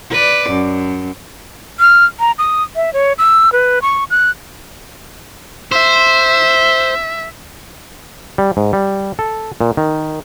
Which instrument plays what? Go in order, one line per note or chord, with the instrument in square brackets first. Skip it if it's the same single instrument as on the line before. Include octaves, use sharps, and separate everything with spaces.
[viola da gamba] B4 D5
F#2
[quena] F6
A#5
D#6
E5
C#5
E6
B4
C#6
F#6
[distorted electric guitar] C5 [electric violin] E5
[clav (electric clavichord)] G3
G#2
G3
A4
A#2
D#3